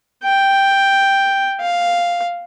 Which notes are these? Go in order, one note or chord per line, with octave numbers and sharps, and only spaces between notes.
G5
F5